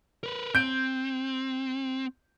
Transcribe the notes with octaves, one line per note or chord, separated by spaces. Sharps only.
A#4 B4
C4 G6 D7